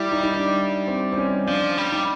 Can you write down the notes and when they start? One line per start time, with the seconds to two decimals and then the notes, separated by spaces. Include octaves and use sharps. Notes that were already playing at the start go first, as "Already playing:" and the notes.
Already playing: G3 E4
0.12 D#4
0.23 D#4
0.34 D4
0.87 C4
1.12 C4
1.17 C#4
1.47 F3 D4
1.78 G3
1.92 D#4